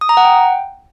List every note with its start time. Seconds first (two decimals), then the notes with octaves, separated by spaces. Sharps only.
0.01 D#6
0.09 A#5
0.17 F#5
0.25 G5